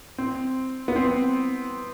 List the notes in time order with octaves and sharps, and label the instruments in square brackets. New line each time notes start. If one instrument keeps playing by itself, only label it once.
[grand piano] C4
B3
C4